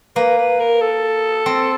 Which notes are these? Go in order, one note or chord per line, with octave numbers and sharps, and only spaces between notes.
A#3 B4
B4
A#4
A4
C4